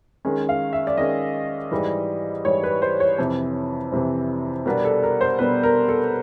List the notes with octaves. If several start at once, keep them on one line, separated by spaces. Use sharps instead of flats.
D#3 G#3 C#4
F5
E5
D5
D#3 G#3 C#4 D#5
G#2 E3 G3
G#2 E3 G3 C#5
B4
C5
C#5
F2 C3 E3
F2 C3 E3
B2 G3 B3 D4 A#4
A4
A#4
C5
B2 G3 B3 D4 B4
A#4
A4